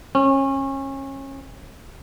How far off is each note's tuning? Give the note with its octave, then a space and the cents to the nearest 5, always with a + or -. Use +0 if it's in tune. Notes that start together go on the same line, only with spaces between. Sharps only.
C#4 -30